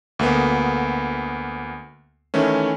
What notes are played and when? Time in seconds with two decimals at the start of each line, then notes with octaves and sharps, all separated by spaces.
0.19 D2 A#3 B3
2.34 D#3 E3 A3 C#4